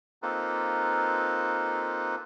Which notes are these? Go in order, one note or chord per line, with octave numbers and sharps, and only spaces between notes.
A#3 C4 D#4 F4 A4 B4